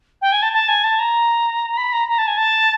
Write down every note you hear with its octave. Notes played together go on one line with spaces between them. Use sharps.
G5
G#5
A5
A5
G#5
A5
A#5
B5
A#5
A#5
A5
G#5
A5